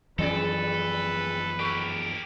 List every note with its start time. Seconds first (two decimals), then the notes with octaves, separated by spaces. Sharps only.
0.19 F#2 C3 E3 F3 G#4 A4 B4 D5
1.59 G#3 G4 A#4